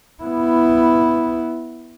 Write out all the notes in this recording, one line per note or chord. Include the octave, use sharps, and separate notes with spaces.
B3 E4